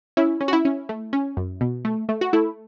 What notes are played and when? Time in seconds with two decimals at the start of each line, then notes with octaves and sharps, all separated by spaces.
0.17 C#4 E4
0.41 C#4
0.48 F#4
0.53 E4
0.65 C#4
0.89 A3
1.13 C#4
1.37 F#2
1.61 B2
1.85 A3
2.09 A3
2.21 F#4
2.33 A3 E4